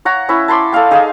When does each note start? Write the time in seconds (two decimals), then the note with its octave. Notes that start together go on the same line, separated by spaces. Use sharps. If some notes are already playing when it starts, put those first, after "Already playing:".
0.05 C#5 F#5 A#5
0.29 C#4 E4 B5
0.48 A5 B5 C6 D6
0.72 A4 D5 F5 G5
0.91 D#4 G#4 D#5 F5